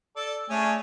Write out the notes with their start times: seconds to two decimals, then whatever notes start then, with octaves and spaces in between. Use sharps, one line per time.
0.16 A4 D5
0.50 A3 C#4 D4 G#4